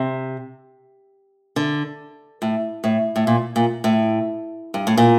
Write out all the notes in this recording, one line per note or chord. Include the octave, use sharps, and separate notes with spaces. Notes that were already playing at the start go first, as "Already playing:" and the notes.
Already playing: C3
D3
A2
A2
A2
A#2
A#2
A2
G2
A2
A#2